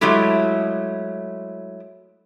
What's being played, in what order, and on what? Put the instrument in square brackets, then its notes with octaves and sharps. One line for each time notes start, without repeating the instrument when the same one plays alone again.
[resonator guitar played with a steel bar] F#3 G#3 A3 E4 G4